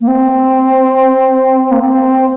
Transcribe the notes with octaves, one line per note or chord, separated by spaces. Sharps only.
A#3
C4
A#3
C4